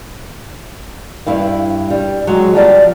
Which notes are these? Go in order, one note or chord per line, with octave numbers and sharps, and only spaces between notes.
G2 E4 F5
G3
F#3 G#3
F3 G3 F4 D5